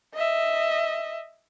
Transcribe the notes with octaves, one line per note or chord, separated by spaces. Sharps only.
D#5 E5